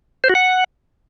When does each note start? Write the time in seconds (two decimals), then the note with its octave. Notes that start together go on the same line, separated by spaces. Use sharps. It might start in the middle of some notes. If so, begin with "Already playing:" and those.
0.24 C5
0.29 F#4
0.35 F#5